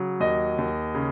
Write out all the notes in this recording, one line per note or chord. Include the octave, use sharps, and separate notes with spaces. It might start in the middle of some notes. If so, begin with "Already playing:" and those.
Already playing: C#3 F#3
D#2 D#5
D#2
C#3